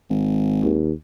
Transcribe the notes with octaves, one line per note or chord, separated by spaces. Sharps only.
G#1
D#2